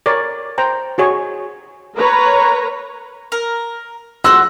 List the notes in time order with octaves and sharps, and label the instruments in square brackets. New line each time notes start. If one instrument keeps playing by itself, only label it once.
[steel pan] A#4 C#5 D5
C5 G5 A#5
F#4 G#4 C#5
[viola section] A#4 B4 C#5 A#5
[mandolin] A#4
[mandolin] F#4 C6 F#6 [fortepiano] E6